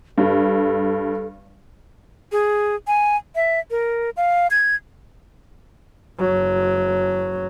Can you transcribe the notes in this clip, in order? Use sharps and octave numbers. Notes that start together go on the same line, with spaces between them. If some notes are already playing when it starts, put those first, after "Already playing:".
G2 A4
G#4
G#5
E5
A#4
F5
G#6
F#1 F#3